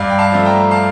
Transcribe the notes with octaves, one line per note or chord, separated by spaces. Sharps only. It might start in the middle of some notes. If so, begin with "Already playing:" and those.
Already playing: G2 D5 F5
G5
F5 A5
F3 A3
G5 A#5
F5 A5